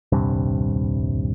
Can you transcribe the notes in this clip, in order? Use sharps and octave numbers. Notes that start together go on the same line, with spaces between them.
D#1 C2 G2 C3